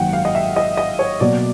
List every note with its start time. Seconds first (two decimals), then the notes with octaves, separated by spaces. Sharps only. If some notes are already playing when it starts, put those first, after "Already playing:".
Already playing: G#1 F#2 D#3 F#3 A#3 F#5 G5
0.13 F5
0.25 D#5
0.35 E5
0.56 D#5
0.77 D#5
0.99 C#5
1.20 B2 F#3 A#3 D5